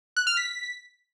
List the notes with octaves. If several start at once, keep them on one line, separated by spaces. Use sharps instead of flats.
F#6
F6
B6